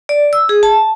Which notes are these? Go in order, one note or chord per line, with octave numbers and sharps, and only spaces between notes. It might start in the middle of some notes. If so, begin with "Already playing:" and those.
D5
E6
G#4
A5